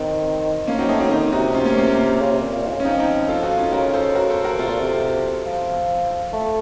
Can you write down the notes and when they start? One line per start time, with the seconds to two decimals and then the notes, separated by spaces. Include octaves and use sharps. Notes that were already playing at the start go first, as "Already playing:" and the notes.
Already playing: D#3 C4
0.67 F3 A#3 C#4
0.78 F#3 C4 D#4
0.89 A3 C4 D#4
1.00 F#3 C4 D#4
1.11 D#3 C4 D#4
1.33 C3 D#4 F#4
1.55 C#4 F4
1.65 A#3 C#4
1.77 A#3
1.88 C4
2.21 C#3
2.32 C3
2.41 A#2
2.56 A#2
2.66 D#3
2.71 C#3
2.80 C#4
2.85 F3 C4 D#4
2.99 C4 D#4
3.28 F4 A4
3.43 D#4 F#4
3.58 C#4 F4
3.72 C#3 F#4 A#4
3.94 A4 C5
4.15 F#4 A#4
4.30 A4 C5
4.44 F#4 A#4
4.59 C3 F4 A4
4.70 A#2
4.80 C3
5.46 F3
6.33 A3